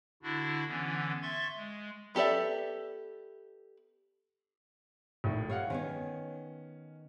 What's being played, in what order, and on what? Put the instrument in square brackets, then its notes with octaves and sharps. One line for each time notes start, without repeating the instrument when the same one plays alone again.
[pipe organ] D3 D4 E4 F#4
D3 E3 B3 C#4
E5 C6 C#6 G#6 A6
G#3
[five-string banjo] B3 G4 A4 D5 E5
[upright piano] A#1 A2 D#3
[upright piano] G4 F5 F#5 [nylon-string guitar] C#5
[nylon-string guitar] D#3 B3 C#5 [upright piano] C#4